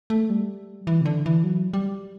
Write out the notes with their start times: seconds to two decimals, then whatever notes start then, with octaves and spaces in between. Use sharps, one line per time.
0.10 A3
0.30 G3
0.87 E3
1.01 C3
1.05 D3
1.26 E3
1.44 F#3
1.73 G3